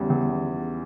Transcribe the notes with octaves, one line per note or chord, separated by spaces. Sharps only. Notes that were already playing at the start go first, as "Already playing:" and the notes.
Already playing: E2 C#3 G3
E2